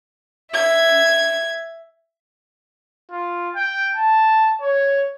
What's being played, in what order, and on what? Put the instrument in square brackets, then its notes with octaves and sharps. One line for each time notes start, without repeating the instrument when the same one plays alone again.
[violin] E5 G#6
[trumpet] F4
G5
A5
C#5